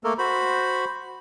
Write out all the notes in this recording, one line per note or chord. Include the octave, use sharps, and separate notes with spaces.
A3 A#3 A4 A#4
F#4 C5 B5